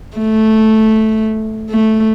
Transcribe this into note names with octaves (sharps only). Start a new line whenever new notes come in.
A3
A3